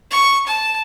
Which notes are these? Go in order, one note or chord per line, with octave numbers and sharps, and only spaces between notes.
C#6
A5